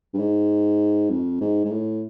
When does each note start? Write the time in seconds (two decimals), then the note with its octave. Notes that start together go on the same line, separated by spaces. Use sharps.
0.14 G2
0.19 G#2
1.10 F2
1.41 G#2
1.65 G#2
1.71 A2